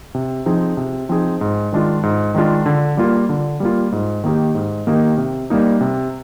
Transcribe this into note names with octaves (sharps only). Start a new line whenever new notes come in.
C3
F3 C4 D#4 G#4
C3
F3 C4 D#4 G#4
G#2
D#3 G#3 D4 F4
G#2
D#3 G#3 D4 F4
D3
G3 A#3 F4
D3
G3 A#3 F4
G#2
D#3 A#3 D#4 G4
G#2
D#3 A#3 D#4 G4
C3
G3 A#3 D#4
C3